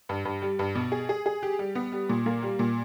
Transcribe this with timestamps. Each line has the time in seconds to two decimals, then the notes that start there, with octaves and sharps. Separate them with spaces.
0.09 G2
0.25 G2
0.42 G3
0.59 G2
0.75 B2
0.92 G#4
1.09 G#4
1.26 G#4
1.43 G4
1.59 G3
1.75 B3
1.92 G3
2.09 A#2
2.26 A#3
2.42 G3
2.59 A#2